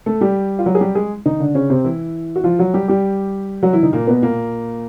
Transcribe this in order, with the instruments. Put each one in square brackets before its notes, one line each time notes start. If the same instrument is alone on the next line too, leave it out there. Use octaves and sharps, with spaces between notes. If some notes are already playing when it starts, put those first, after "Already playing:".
[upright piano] A3 A4
G3 G4
F4
F#3 F#4
G#4
G3 G4
G#3 G#4
D#3 D#4
D3 D4
C#3 C#4
C3 C4
E3 E4
F#4
F3 F4
F#3 F#4
G3 G4
G3 G4
F#3 F#4
E3 E4
D#3 D#4
A#2 A#3
B2 B3
A#2 A#3